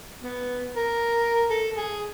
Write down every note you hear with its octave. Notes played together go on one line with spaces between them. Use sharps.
B3
A#4
A4
G#4